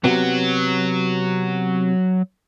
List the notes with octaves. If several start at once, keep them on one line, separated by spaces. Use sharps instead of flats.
C3 F#3 B3 F#4